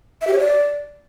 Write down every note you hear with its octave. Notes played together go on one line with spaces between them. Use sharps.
E5
G4
C#5
D5